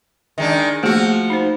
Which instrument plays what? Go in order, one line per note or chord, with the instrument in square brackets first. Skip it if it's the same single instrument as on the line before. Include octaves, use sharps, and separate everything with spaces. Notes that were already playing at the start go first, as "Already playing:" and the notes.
[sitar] D#3 G#3 D4
[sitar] F3 F#4 [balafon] A3 A#3 G#4
[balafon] D#4 C5